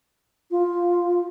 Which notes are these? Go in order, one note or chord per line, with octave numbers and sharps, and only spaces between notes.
F4